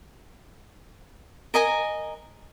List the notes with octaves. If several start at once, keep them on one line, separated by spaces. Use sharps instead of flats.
A#4 D#5 G#5 A#5